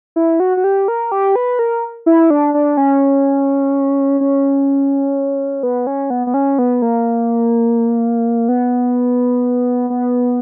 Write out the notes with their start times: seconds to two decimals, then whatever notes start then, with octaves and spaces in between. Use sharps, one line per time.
0.16 E4
0.40 F#4
0.57 F#4
0.64 G4
0.88 A#4
1.12 G4
1.36 B4
1.59 A#4
2.06 E4
2.30 D4
2.54 D4
2.77 C#4
4.21 C#4
5.63 B3
5.87 C#4
6.10 B3
6.27 B3
6.34 C#4
6.59 B3
6.82 A#3
8.49 B3
9.90 B3